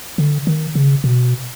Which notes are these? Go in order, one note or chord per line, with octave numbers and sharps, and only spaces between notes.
D3
D#3
C#3
B2